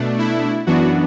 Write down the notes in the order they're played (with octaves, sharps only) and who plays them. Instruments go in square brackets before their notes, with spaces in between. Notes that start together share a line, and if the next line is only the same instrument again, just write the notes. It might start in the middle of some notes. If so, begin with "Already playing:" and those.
Already playing: [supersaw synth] B2 A3 D4
E4
F#2 E3 B3 D4 F#4